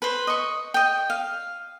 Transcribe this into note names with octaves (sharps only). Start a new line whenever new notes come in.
B4 C5
D#5 C#6
D#5 G5
F5